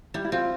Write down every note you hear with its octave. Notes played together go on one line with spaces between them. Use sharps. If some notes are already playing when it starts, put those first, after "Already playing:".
G3 E4
E4
C4 F4